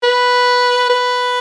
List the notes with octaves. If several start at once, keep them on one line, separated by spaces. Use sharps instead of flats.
B4
B4